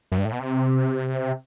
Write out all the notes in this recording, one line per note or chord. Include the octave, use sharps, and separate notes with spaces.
F#2
G2
A2
B2
C3